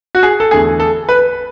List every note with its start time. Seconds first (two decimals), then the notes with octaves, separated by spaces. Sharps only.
0.15 F#4
0.23 G#4
0.40 A4
0.51 E2 D3 A3 G#4
0.80 A4
1.09 B4